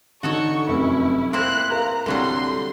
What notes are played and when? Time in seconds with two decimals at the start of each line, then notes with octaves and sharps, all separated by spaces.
0.23 D3 D#4 F#4 A4 C#5 C#6
0.68 F1 F#2 E4
1.33 A#3 C4 E4 C6 F#6
1.72 A#4 F5 A#5
2.06 C2 D3 F#3 G3 C6